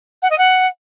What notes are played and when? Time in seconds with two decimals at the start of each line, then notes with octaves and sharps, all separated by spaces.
0.22 F#5
0.30 D#5
0.38 F#5